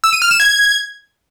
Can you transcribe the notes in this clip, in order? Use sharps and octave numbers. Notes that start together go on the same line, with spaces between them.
E6
D#7
F6
E7
G#6